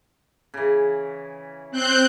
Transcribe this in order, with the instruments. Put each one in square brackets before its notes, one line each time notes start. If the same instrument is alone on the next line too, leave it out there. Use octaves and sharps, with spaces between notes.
[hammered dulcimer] C#3 E3
[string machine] C4 F#6 G6